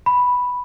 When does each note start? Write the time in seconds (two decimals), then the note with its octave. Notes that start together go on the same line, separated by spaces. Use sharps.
0.06 B5